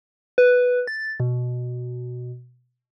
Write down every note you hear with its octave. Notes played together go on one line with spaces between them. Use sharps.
B4
A6
B2